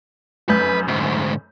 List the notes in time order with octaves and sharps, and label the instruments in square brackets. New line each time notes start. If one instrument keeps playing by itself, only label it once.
[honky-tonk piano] F1 F#2 G6 [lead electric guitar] B4
[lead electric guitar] D2 G#2